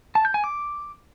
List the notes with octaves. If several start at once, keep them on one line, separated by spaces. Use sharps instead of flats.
A5
G6
G#5
D6